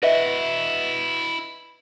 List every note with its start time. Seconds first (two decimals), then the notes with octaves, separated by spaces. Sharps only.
0.03 E4 F#4 B4 D#5 E5